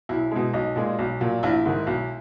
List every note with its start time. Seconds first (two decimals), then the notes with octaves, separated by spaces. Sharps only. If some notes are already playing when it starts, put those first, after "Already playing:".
0.09 B1 E4
0.31 B2 G#3
0.53 B1 D#4
0.76 A#2 G#3
0.99 B1
1.20 A#2 F#3
1.43 A#1 E4
1.66 G#2 D#3 G#3
1.87 B1